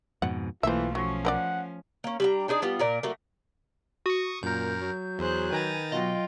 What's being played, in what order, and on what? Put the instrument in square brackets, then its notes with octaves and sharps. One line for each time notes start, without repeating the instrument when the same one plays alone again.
[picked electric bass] F2 G#2 B2 [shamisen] F#5
[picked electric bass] B1 [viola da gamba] E3 A3 A#3 [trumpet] F4 [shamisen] C5 E5
[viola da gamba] F3 C#4 [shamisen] F#3 [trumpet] C#6
[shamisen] A#4 B4 D5 [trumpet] F#5
[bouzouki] A#3 C#4
G3 D4 A#5
D4 D#4 G#4 D5
G3 B3 F4
A#2 A#4 D5
F#3 A3 A#3
[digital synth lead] F#4 [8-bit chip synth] C#6 D#6
[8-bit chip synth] F#2 A#4 [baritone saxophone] A#2 [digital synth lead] G6
[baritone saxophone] F#3
[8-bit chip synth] E2 [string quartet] G#4 C5 F#6
[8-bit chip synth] D#3 A#5 A6 [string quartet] B4 G#5
[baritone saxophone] B2 [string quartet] F#3 F4 G5 [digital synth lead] D#5